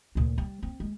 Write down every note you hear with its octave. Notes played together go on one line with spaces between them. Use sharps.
D2 A#2
G3
C4
G#3